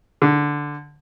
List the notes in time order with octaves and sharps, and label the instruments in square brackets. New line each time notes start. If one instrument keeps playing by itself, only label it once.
[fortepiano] D3